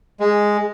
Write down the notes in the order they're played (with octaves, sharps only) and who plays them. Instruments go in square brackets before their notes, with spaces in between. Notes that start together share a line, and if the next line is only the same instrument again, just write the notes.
[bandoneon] G#3